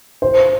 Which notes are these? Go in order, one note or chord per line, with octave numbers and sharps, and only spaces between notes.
C5